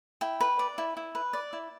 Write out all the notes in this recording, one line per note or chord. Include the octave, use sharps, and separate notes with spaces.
E4 G5
B4
D5
E4
E4
B4
D5
E4